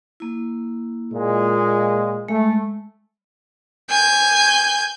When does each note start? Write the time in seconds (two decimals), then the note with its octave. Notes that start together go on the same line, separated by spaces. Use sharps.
0.20 A#3 E4
1.12 A#2 G#3
2.28 G#3 A3
3.90 G#5 G6